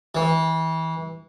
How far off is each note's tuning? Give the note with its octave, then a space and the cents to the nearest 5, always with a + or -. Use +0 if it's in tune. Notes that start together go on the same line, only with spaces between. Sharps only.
E3 -30